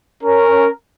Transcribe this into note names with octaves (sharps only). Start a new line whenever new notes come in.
C#4 A#4